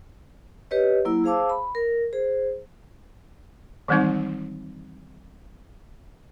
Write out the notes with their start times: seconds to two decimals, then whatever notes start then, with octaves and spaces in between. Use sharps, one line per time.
0.71 G4 B4 C#5 D#5
1.05 F#3 A#3 E4 E6
1.24 G#4 C5 F5 A5 D6 E6
1.50 B5
1.75 A#4
2.13 G#4 C5
3.88 D#3 E3 G3 G#3 C4 D#4